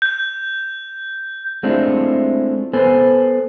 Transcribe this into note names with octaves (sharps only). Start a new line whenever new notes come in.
G6
G#3 A3 C4 D4 E4 F4
B3 A4 B4 C5 G#5